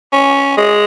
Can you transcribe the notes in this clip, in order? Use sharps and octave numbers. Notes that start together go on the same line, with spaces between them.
C#4
G#3